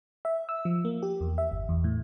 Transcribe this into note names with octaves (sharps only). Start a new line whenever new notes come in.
E5
E6
F3
A#3
G4
E2
E5
G1
E2
A2